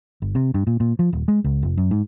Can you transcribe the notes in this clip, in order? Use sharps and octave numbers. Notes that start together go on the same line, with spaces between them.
G1
C3
G2
A#2
A#2
F3
D#1
G#3
C#2
F1
F#2
G#2